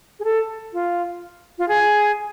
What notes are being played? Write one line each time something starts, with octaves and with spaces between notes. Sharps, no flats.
G#4
A4
F4
F4
G#4